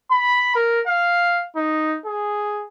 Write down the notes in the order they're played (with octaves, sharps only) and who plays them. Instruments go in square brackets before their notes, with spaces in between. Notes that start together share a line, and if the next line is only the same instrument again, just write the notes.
[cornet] B5
A#4
F5
D#4
G#4